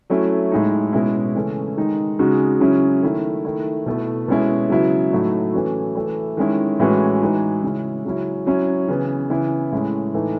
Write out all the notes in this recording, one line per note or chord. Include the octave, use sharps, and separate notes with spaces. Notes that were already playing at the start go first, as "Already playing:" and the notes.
F#3 A3 C#4 E4
A2 G#3 D#4
B2 G#3 C#4 E4
C#3 E3 A3 C#4
D#3 G#3 D#4
C#3 G#3 D#4 F#4
C#3 F#3 C#4 E4
D#3 A3 E4
D#3 A3 E4
B2 A3 E4
B2 G#3 C#4 E4
C#3 F#3 B3 E4
A2 F#3 A3 D#4 F#4
E3 A3 C#4 F#4
E3 A3 E4
D#3 G#3 C#4 E4
A2 E3 G#3 C#4 F#4
E3 G#3 D#4 F#4
C#3 G#3 C#4 E4
C#3 F#3 C#4 E4
F#3 C#4 E4
C#3 E3 B3
C#3 E3 B3 E4
A2 G#3 C#4 E4
A2 E3 A3 D#4